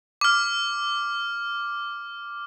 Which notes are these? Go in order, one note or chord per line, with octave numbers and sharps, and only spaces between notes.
D6 F6